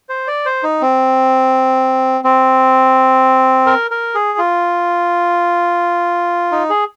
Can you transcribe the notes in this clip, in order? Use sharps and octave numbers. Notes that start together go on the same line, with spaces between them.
C5
D5
C5
D#4
C4
C4
A#4
A#4
G#4
F4
D#4
G#4